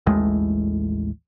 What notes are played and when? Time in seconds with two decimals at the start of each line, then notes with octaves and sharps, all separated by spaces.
0.06 A1 D#2 A2 G#3